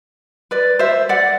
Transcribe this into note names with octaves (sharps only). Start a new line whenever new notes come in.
B4 D5
C5 E5
D5 F#5